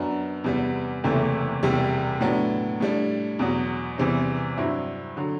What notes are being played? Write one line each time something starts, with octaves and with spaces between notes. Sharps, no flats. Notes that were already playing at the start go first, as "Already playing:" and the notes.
Already playing: F#2 F#3 B3 D4
E2 C3 G3 B3
F#1 E2 C3 E3 A3
E1 E2 C3 G3
A2 F#3 B3 D4
A2 G3 D4
E2 B2 F#3
E2 C3 E3 G3 C4
G2 F#3 C4 E4
D3 F#3